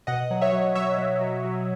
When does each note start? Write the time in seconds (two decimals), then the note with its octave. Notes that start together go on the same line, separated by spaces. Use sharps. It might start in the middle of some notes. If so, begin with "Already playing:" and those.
0.07 B2 D#5 F#5
0.31 F#3
0.41 C#5 E5
0.53 F#3
0.75 F#3 C#5 E5
0.98 F#3
1.21 F#3
1.45 F#3